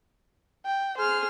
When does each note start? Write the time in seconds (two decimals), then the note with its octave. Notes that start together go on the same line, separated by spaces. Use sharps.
0.66 G5
0.97 G#4 C5 F6